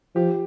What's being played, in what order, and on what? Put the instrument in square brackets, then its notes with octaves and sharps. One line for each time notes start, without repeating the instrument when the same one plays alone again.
[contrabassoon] F3 [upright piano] G4